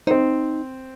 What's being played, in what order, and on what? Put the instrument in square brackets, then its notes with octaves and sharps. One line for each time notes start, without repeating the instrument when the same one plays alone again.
[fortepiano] C4 C5 [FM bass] D#4